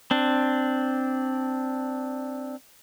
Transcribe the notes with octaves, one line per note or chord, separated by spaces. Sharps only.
C4 D4